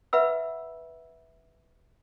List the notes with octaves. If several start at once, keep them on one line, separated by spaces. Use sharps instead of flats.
B4 E5 F#5 B5 E6